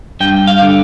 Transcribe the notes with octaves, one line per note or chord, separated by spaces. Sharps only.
G2 G5
F5
D3